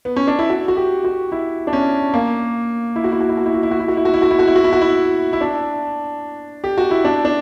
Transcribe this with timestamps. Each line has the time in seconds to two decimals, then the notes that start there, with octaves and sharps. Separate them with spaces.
0.05 B3
0.16 C#4
0.27 D4
0.39 E4
0.50 F#4
0.68 F#4
0.77 G4
1.04 F#4
1.32 E4
1.67 D4
1.73 C#4
2.13 A#3
2.96 E4
3.04 F#4
3.12 E4
3.21 F#4
3.29 E4
3.37 F#4
3.46 E4
3.54 F#4
3.63 E4
3.71 F#4
3.80 E4
3.88 F#4
3.97 E4
4.05 F#4
4.14 E4
4.22 F#4
4.31 E4
4.39 F#4
4.47 E4
4.56 F#4
4.64 E4
4.73 F#4
4.81 E4
5.33 E4
5.41 D4
6.64 G4
6.78 F#4
6.91 E4
7.04 D4
7.25 D4